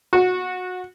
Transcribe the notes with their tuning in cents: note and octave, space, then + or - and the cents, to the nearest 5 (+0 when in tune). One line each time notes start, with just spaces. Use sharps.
F#4 -20